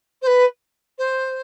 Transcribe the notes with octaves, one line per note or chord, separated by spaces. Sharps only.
C5
B4
C5